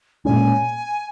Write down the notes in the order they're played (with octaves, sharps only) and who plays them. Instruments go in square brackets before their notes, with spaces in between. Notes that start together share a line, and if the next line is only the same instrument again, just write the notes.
[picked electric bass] A#2 G#3 C#4 [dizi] G#5